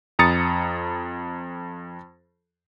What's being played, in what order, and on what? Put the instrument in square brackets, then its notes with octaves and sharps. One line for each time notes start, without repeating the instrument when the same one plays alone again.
[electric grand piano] F2 A#5 D#6 A6 C#7